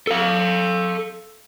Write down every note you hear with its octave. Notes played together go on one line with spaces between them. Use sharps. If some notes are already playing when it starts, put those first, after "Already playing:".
A4 F5